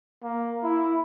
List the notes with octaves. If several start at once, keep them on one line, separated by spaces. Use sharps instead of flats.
A#3
E4